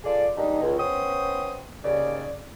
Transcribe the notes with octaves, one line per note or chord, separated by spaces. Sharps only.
F4 G#4 A4 D5
G#2 G3 A#3 D4 D#4
C#2
B3 C#4 C5 G5 D#6
D#2 C#3 D5